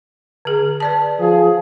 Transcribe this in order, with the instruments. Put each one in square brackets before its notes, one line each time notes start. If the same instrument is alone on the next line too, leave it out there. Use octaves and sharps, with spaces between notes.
[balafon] D3 G#4
B4 D5 A5
[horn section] F3 G#4